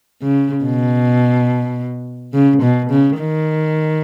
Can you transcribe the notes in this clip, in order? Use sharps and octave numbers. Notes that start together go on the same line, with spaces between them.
C#3
B2
C#3
B2
C#3
D#3